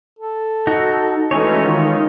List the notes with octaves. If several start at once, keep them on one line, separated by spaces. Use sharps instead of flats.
A4
D#4 F#4
E3 G#3 A3 C#4 D#4 F#4 C#5
D#3 F4